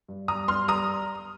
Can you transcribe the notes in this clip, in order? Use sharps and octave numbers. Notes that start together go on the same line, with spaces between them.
G2
G2 A#5 D#6
G2 C6 F6
G3 A#5 D#6